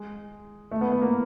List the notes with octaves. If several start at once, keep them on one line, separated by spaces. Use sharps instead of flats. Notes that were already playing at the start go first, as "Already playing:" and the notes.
Already playing: G#3
A3
B3
B3
A#3